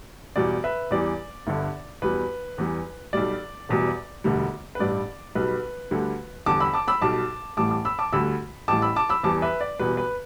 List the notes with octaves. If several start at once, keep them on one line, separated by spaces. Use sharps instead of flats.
E1 E2 B2 G3 D5
B4 E5
E2 E3 G3 D5
G1 G2 D3
E2 B2 G3 B4
E2 E3 G3
B1 B2 G3 D5
E1 E2 B2 G3
E1 D2 D3 G3
B4
A1 G2 G3 D5
B1 B2 G3 B4
D2 D3 G3
E2 D3 G3 A5 D6
B5 E6
A5 D6
B5 E6
B1 B2 G3 A5 D6
A1 A2 E3 G3 A5 D6
A5 D6
B5 E6
A5 D6
D2 D3 G3 B5 E6
A1 A2 E3 G3 A5 D6
B5 E6
A5 D6
B5 E6
E2 E3 G3 A5 D6
B4 E5
D5
E1 E2 B2 G3 B4
B4